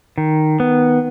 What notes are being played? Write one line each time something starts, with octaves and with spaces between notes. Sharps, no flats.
D#3
B3